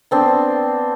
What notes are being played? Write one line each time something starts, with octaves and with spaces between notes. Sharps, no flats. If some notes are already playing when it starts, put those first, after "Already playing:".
B3 C4 D4